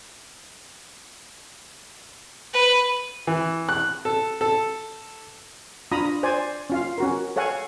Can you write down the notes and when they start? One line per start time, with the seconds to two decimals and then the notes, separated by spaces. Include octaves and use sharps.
2.53 B4
3.27 E3
3.69 F#6
4.05 A4
4.41 A4
5.91 D4 F4 A#5 B5 D#6
6.23 C5 D5 G#5
6.70 C#4 F4 F5
6.98 C#4 F#4 A#4
7.36 A4 C#5 F5 F#5 G#5